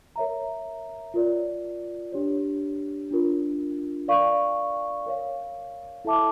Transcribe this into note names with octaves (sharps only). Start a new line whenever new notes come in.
A#4 C#5 E5 A#5
F4 A#4 D5
D4 G4 C#5
D4 F4 A#4
A#4 D5 F5 C#6
A#4 C#5 F5
E4 A4 E5 A5 D6